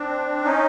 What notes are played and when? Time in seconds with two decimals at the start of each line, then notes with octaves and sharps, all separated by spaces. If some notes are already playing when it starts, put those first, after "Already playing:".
Already playing: C4 D4
0.44 C#4 D#4